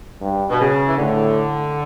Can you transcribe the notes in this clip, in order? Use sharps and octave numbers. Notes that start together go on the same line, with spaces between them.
G2
B2
C#3
E3
A2 D3